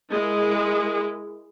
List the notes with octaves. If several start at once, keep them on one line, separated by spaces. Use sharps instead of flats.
G#3 E4 A#4